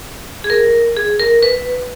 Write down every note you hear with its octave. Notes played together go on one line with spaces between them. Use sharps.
G#4
A#4
G#4
A#4
B4